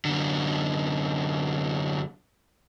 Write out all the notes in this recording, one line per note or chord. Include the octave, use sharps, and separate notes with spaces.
F#2 D3